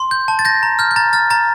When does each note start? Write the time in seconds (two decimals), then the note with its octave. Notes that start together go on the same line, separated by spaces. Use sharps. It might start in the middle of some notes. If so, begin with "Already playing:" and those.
Already playing: C6
0.11 G6
0.28 A5
0.39 A6
0.45 G6 A#6
0.63 A#5
0.79 F6 G6
0.91 G6
0.96 A#5 A6
1.13 F6 A6
1.30 A#5 A6